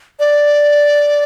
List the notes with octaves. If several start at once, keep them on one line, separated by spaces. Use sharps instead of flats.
D5